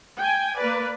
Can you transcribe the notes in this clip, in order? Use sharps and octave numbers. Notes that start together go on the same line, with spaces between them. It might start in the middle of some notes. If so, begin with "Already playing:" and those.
G5 G#5
A#3 B4 D5